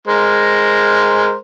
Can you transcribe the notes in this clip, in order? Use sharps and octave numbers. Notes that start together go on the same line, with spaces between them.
G#3 A#4 C5